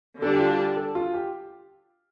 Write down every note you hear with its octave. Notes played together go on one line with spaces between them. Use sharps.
D3 G3 D4 A4
G4
F4
G4
A4
F4
G4